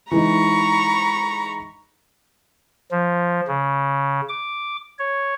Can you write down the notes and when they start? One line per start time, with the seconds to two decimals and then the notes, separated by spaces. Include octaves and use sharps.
0.11 E3 G#3 D#4 A#5 B5 C#6
2.91 F3
3.48 C#3
4.29 D6
4.99 C#5